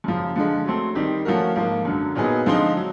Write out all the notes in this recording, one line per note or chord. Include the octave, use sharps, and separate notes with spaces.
F#2 C#3 F3
D3 F3 G#3
F#3 A3 C4
D#3 G3 C4 D#4 G4
F3 A3 C#4 F#4 A#4
G#2 F3 A#3
F#2 D3 F#3
A#2 F#3 B3 D#4 G#4
D3 F3 G#3 C4 D#4
F#3